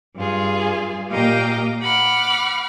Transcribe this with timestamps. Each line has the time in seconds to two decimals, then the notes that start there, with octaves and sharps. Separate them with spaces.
0.16 G2 F4 G#4
1.11 A#2 G4 D#5 F5 G5 A#5
1.83 F#5 B5 D6 F6